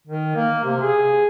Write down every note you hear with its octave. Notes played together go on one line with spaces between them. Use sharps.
D#3
A#3
C3
G#4